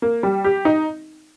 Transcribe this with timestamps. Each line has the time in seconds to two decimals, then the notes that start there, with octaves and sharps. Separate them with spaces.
0.02 A#3
0.23 G3
0.44 G4
0.65 D#4